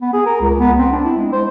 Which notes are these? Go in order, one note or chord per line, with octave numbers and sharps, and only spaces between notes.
B3
G#4
A#4
C#2
B3
C4
D4
E4
G#3
C5